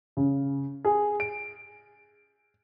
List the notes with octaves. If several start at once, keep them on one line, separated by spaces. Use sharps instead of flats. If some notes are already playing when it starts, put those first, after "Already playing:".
C#3
G#4
D7